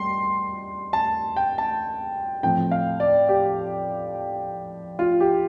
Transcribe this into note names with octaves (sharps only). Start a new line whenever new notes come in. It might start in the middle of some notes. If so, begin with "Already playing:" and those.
Already playing: G3 C6
A5
G5
A5
A2 F3 C4 G5
F5
D5
G4
F4
G4